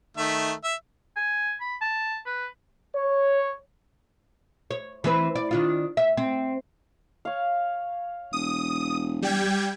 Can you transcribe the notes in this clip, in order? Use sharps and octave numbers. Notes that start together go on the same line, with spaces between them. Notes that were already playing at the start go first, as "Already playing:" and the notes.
D#3 A3 E5
E5
G#5
B5
A5
B4
C#5
C#5
E3 C4 B4
D5
D#3 D4 F4
E5
C4
C#5 F5
E1 D#6
G3 G5 G#6